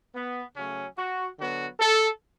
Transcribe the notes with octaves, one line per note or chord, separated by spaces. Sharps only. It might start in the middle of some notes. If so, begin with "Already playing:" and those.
B3
C#3 F#3 A3 C#4
F#4
D3 F#3 B3 F#4
A4